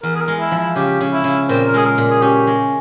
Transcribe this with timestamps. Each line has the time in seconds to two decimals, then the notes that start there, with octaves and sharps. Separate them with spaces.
0.03 E2 A#4
0.15 G#4
0.21 A#4
0.28 G#3
0.40 E4
0.51 F3
0.58 E4
0.76 C#3 G4
1.01 C#3
1.13 E4
1.24 C#3
1.49 A#2 C4
1.67 A#4
1.74 G#3 G#4
1.85 A#4
1.98 A#2
2.10 G#4
2.22 C#4 G4
2.47 G#3